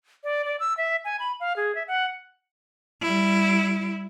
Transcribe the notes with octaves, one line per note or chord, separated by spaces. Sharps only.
D5
D5
E6
E5
G#5
B5
F5
G#4
E5
F#5
G3 E4